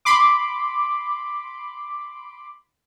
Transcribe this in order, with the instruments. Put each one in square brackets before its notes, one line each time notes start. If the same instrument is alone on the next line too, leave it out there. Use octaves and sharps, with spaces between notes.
[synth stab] B5 C6 D6